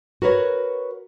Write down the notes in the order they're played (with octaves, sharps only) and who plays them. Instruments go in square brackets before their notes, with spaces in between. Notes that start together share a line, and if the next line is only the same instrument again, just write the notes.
[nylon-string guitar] F#4 A#4 B4 C#5